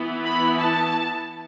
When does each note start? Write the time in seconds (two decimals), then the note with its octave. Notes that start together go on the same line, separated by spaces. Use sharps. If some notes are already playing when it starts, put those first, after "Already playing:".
Already playing: E3 B3 E4
0.23 B5
0.58 A5